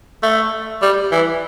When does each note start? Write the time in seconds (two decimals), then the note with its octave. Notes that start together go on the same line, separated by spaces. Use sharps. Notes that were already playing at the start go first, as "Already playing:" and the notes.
0.23 A3
0.82 G3
1.12 E3